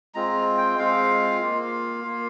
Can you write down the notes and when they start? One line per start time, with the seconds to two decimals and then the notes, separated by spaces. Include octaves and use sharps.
0.14 G#3 C4 F4 A#5
0.57 G5
0.78 G#3 C4 F4 F5
1.41 A#3 F4
2.05 A#3 F4